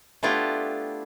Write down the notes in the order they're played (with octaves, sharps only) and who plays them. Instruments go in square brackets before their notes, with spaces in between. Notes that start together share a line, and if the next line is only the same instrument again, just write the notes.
[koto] A3 B3 D4 E4 F4 G4